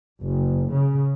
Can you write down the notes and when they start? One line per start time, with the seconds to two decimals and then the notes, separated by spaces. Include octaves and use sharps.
0.23 F#1
0.72 C#3